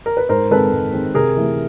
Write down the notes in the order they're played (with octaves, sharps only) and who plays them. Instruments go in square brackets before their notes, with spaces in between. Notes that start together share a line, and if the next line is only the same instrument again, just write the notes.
[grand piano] A#4
B4
G#2 A#4 C5
D#3 G#3 C4 A4 B4
G#2
D#3 G#3 C4
C3 G#4 A#4
E3 A3